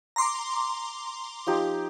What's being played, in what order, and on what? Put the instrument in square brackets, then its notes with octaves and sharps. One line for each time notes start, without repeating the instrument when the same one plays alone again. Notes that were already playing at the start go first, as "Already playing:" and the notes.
[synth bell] A#5 C6 D6
[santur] F3 D#4 G4